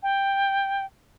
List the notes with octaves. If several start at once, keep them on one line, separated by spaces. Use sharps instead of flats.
G5